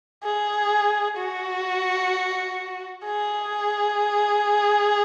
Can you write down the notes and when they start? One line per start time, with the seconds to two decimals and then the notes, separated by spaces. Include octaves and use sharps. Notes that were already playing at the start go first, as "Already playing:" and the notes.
0.24 G#4
1.18 F#4
3.05 G#4